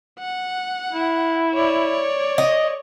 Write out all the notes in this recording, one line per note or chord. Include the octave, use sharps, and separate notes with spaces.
F#5
E4
C#5 D5
D#5